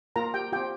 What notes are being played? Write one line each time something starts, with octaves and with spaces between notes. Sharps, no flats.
A#3 F4 A#4 A#5
G4 G5
C4 F4 G4 G5